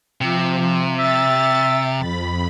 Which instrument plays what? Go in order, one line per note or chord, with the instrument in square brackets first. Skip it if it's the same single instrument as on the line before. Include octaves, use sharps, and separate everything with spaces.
[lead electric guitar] C3 [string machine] F3
[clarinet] E5 [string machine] A6
[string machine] F2 B5